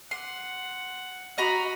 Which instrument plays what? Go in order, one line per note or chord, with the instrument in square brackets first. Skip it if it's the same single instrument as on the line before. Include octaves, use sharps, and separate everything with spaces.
[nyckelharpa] F#5 [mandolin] C6
[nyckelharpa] F#4 [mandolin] D#5 A#5 B5